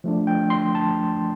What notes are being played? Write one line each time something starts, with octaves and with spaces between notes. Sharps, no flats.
F3 A3 D4
G5
C6
A5